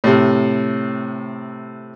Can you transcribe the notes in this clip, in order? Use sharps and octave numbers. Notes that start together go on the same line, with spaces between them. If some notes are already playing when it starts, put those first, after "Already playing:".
A2 C3